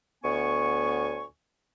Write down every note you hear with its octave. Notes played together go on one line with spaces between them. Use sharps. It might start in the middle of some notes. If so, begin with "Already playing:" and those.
D2 A2 B3 G#5 C#6